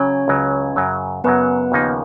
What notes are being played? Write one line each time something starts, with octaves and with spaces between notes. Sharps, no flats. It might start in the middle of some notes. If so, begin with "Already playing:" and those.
Already playing: C#3 F#3 C#4 C#5
C#2 C#3 F#3
F#2 C#3 F#3
F#2 C#3 F#3 B3 B4
D#2 C#3 F3 A#3 D#4